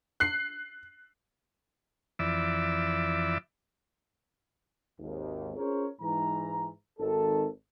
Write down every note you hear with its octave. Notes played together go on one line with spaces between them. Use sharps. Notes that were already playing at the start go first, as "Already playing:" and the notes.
F#6 C7
F2 E3 D5 E5
G#1 D#2
C#4 F4 G#4 A#4 C5 C#5
G#2 E3 A#5
G#1 D#3 A4